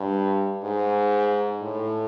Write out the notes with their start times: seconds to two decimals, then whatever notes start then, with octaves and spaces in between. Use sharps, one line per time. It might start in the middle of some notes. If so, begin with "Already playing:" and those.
Already playing: G2
0.63 G#2
1.62 A2